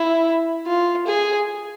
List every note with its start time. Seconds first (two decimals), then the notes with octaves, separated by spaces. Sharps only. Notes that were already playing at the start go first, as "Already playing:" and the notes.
Already playing: E4
0.67 F4
1.07 G#4